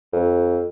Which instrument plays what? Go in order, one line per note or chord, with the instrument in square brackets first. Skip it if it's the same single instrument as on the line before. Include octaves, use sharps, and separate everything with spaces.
[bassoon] F2